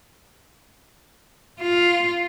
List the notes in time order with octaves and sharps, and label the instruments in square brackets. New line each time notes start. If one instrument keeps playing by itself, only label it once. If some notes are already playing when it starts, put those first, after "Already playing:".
[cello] F4